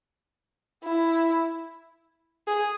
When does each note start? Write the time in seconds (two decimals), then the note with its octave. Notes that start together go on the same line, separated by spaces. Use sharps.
0.83 E4
2.47 G#4